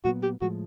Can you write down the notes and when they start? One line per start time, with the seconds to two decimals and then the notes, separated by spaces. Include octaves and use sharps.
0.05 A#2 F#3 B3 F#4
0.23 G4
0.41 A2 F3 G#3 F#4